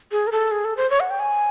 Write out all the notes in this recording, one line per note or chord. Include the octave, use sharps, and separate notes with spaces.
G#4
A#4
A4
G#4
A4
C5
C#5
F#5
G5
G#5